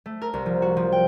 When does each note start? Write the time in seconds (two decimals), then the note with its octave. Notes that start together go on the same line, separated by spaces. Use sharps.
0.06 A3
0.22 A#4
0.34 C2
0.46 F3
0.62 F#4
0.77 F3
0.92 G5